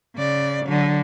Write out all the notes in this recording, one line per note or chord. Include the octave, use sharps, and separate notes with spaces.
C#3 D5
D3 F#3